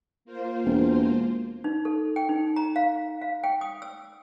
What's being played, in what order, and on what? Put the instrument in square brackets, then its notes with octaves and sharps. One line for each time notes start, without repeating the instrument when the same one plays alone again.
[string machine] A#3 F4 C5
[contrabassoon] E1
[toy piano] D#4
A4
G5
D#4
A#5
F5
F5
G5
D#6
E6